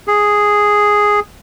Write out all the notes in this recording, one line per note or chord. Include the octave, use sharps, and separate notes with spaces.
G#4